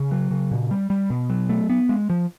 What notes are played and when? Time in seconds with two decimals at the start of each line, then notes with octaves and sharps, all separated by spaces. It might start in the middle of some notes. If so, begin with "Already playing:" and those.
Already playing: C#3
0.11 F#3
0.31 C#3
0.51 A#2
0.71 G3
0.90 G3
1.10 B2
1.30 F#3
1.49 A3
1.70 B3
1.89 G#3
2.10 F3